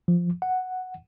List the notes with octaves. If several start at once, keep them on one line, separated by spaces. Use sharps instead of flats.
F3
F#5